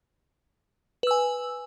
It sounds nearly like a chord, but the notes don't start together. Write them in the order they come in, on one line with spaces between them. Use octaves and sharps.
B4 E6 G#5